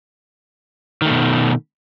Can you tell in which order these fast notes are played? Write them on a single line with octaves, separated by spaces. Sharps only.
D#3 A3 B2